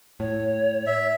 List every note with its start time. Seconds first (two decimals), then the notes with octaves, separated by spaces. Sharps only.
0.20 A2 C#5
0.87 E5